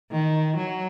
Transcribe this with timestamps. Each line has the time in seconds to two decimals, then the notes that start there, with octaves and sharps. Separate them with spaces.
0.11 D#3
0.56 F#3